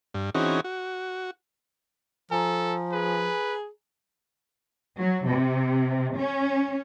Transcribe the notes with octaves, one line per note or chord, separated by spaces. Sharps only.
G2
E3 C4 C#4 D#4 F#4 G#4
F#4
F3 A4 G#5 A#5
G#4 B4
F#3
C3
C#4